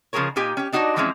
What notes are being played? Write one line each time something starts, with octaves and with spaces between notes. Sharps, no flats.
C#3 F3 A3 G#4 A#4 C#5
A#2 D#4 G4 G#5
C#4 G4
D4 D#4 F#4 C#5 D5
E3 F3 G#3 C4 C#4 E4